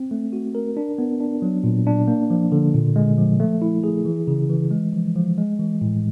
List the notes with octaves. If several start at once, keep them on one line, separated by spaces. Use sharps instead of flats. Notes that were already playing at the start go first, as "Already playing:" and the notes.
Already playing: C4
A3
F#4
A#4
D4
B3
D4
F#3
A#2
D4
A#3
F3
D3
A#2
G#3
F3
A3
E4
G#4
E3
C#3
E3
G#3
F3
F3
G#3
E3
A2